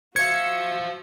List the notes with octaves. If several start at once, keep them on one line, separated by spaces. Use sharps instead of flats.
F#4 C5 E5 F5 G#6 C#7